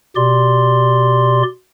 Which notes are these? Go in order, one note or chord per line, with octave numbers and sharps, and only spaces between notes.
B2 G4 D5 C6